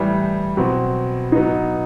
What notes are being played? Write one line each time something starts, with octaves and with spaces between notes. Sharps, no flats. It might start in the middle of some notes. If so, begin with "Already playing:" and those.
Already playing: A2 E3 G3
B2 F#3 C4
F#3 B3 D#4